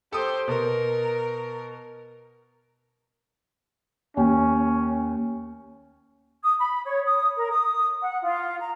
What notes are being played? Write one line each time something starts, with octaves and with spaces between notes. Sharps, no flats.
G4 A4 C5 D#6
B2 A#4
D#2 C#4 G5
D#6
B5
C#5
D#6
A#4
D#6
F#5
F4
A#5